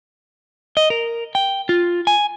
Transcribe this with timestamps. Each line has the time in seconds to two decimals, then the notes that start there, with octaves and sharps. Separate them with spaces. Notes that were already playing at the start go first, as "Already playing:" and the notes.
0.77 D#5
0.90 A#4
1.35 G5
1.69 F4
2.07 G#5